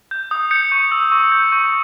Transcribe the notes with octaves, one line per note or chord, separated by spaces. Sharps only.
G6
D#6
G6 C#7
C#6
E6
C#6
G6
C#6